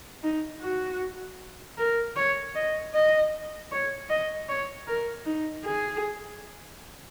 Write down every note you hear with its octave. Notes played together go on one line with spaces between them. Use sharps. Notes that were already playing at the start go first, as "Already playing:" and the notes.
D#4
F#4
A#4
C#5
D#5
D#5
C#5
D#5
C#5
A#4
D#4
G#4